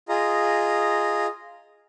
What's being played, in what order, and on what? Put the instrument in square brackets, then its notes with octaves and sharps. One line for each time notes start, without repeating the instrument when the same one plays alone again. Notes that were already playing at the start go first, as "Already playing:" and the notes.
[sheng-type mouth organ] F4 G#4 D#5 A#5